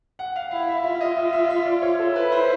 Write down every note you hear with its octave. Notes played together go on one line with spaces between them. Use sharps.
F#5
F5
E4 F5
E5
F4 E5
D#5
E5
E5
E5
D5
C#5
A4
E4 B4
C5